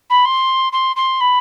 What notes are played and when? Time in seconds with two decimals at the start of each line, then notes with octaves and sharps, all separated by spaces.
0.10 B5
0.25 C6
0.73 C6
0.96 C6
1.21 B5